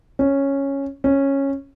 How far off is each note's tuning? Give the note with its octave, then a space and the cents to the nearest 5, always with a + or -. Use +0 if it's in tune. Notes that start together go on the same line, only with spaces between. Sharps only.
C#4 -5
C#4 -10